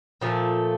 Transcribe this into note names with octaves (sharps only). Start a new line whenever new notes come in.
A#2 F3 A3